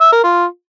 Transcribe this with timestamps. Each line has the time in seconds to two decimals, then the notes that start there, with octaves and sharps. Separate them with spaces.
0.01 E5
0.12 A#4
0.24 F4